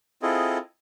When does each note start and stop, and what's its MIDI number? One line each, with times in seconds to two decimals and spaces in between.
0.22 0.58 60
0.22 0.58 64
0.22 0.58 65
0.22 0.58 68
0.22 0.58 69
0.22 0.58 75